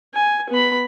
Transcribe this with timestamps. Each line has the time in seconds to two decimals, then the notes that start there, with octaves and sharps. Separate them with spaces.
0.14 G#5
0.50 B3 B5